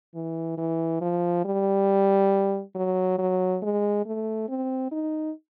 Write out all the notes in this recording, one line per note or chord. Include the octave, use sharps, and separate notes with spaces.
E3
E3
F3
G3
F#3
F#3
G#3
A3
C4
D#4